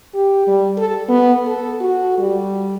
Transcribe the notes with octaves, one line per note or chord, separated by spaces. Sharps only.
G4
G3
A4
B3
A4
F#4
G3